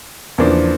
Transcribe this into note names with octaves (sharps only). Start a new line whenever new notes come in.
E2 C#3 F3 A#3 D4